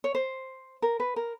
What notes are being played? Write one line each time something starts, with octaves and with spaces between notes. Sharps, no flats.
C#5
C5
A#4
B4
A#4